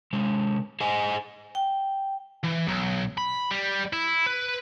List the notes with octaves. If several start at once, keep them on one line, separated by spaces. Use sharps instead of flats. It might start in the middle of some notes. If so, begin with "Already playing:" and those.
C3 G#3
G#4 C5 D#5 F#5 G#5
G5
E3
B1
B5
G3
E4
B4